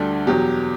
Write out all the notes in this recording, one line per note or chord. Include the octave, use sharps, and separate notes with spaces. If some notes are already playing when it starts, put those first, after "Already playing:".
Already playing: D2 D3 G3 A4
E2 B2 F#3 G4